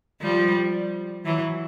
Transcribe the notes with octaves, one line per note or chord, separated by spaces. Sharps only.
F3 G3
E3 F#3